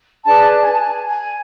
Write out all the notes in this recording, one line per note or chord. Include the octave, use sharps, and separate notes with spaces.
D4 G#4 B4 A5
A5
G#5
A5
G#5
G#5